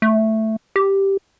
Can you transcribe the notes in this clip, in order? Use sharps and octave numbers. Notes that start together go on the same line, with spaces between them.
A3
G4